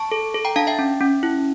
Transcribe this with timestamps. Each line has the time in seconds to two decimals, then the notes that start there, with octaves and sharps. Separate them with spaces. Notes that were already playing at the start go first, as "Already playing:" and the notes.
Already playing: A5 C#6
0.12 A4
0.34 A4
0.45 G5 A#5
0.56 D4 F5 A5
0.67 E5 G5
0.79 C#4
1.01 C#4
1.23 E4